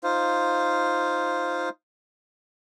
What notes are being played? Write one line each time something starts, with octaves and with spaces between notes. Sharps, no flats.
D#4 F4 C5 F5